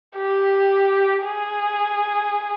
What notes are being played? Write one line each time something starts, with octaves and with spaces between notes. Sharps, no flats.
G4
G#4